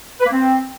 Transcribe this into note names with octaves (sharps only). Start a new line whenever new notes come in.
B4
A#3
C4